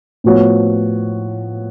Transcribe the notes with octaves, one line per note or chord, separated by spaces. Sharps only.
A2 F3 B3 F#4 C#5